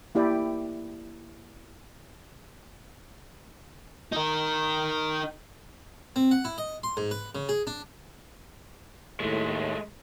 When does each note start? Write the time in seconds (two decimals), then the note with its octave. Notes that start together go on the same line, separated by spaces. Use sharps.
0.15 A#3 E4 G4 D5 G5
4.12 D#4 A#4
6.16 C4
6.31 F#5
6.45 E4
6.58 D#5
6.83 C6
6.97 G#2
7.11 B4
7.35 C#3
7.49 G#4
7.67 D4
9.20 D#2 A2 G#3 A3